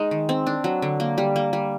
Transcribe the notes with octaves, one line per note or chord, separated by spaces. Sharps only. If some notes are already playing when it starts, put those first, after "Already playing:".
Already playing: G#3 D#4
D#3
C4
D4
F#3
D3
A#3
G3
A#3
G3